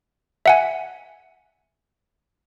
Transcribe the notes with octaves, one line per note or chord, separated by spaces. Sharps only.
E5 F#5 G#5